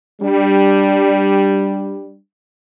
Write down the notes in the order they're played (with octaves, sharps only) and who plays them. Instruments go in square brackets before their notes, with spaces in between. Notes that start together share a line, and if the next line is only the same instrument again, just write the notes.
[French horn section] G3 D4